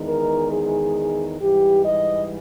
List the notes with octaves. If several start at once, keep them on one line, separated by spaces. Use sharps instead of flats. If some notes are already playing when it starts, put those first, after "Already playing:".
Already playing: E2 D#3 G#3
A#4
G#4
G#2 E3 G3 G4
D#5